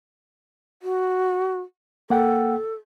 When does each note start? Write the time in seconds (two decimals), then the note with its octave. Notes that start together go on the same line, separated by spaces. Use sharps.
0.83 F#4
2.10 A#3 A4 F#5 G5